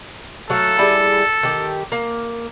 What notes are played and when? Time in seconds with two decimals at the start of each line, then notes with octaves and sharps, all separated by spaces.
0.50 F#3 A3 A4 F5
0.79 G3 E4 G#4
1.43 D#3 G4 G5
1.92 A#3